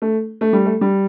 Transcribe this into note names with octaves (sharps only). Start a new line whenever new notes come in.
A3
A3
G3
A3
G3